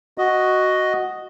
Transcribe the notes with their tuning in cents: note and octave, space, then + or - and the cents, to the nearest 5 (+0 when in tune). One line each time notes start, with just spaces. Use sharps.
F#4 +0 D#5 +0